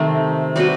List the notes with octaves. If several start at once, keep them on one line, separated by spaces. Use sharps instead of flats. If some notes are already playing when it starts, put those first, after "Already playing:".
Already playing: C3 D#3 A3 C4
G3 C4 F#4 B4